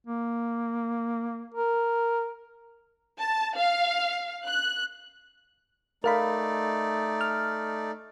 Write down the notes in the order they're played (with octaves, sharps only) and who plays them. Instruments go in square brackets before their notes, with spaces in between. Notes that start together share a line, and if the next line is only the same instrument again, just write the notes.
[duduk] A#3
A#4
[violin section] A5
F5
F#6
[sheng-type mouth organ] A3 D#4 D5 [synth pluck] A#4 F5 B5
[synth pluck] F6